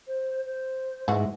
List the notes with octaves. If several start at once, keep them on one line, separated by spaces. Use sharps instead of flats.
C5
C5
G#2 E3 F#4 E5